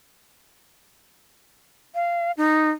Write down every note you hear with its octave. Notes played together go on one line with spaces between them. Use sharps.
F5
D#4